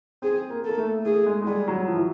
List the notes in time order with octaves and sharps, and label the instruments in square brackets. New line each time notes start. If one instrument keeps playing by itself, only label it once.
[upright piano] C4 [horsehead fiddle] G#4
[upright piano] A#3
[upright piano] A#3 [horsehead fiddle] A4
[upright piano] A3
[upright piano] A3 [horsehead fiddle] G#4
[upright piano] G#3
G#3
[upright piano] G3 [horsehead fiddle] G#4
[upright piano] F#3
F3
E3